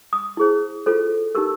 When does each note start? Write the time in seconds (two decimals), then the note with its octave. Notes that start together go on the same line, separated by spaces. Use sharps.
0.13 D#6
0.37 E4 G#4 C5
0.86 F4 A4 C5
1.35 D#4 G4 A#4 E6